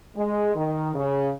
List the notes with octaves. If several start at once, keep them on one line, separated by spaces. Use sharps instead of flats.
G#3
D#3
C#3